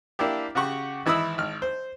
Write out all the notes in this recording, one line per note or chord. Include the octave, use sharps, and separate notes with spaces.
A#3 D4 E4 G4
C#3 F#4 G4 F#5 C#6
G#1 E3 E4 B5 D#6 E6
G#1 F6
C5